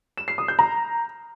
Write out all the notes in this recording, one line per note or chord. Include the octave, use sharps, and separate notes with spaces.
E7
C7
D#6
G6
A#5